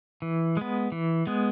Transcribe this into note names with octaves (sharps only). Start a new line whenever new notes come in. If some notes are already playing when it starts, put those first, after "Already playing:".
E3
G#3 B3
E3
G#3 B3